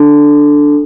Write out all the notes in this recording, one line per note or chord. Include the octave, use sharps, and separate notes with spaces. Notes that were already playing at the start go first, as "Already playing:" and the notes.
Already playing: D4 A4